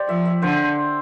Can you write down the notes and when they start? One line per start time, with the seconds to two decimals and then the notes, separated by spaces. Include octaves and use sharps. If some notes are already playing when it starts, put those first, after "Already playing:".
Already playing: G4 C5 D5
0.08 F3 E5
0.25 E5
0.42 D3 C5